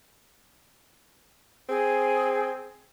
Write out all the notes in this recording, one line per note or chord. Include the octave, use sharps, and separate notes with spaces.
C4 G#4